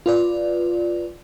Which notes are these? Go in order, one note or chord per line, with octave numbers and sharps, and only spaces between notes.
F4 B4 D5